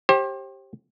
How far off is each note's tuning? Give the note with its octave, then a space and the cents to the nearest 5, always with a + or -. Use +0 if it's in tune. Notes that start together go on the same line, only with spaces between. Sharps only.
G4 -5 C5 +35